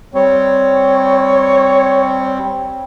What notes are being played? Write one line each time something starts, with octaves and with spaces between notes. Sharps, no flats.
G3 C4 C#5